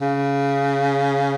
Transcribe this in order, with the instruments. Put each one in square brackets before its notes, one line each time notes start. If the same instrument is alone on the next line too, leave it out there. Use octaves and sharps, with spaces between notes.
[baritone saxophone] C#3